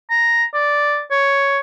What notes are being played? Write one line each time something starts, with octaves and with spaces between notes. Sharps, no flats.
A#5
D5
C#5